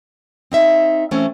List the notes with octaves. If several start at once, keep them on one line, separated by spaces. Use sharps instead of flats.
C4 D#4 E5
E3 A3 C4 C#4